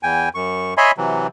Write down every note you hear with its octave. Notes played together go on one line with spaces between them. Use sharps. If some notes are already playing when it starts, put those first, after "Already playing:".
E2 G5 G#5
F#2 C#6
C#5 D#5 E5 G#5 B5 C6
C3 E3 F#3